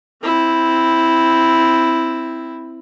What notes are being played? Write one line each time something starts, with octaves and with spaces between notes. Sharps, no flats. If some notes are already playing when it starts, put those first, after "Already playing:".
C4 E4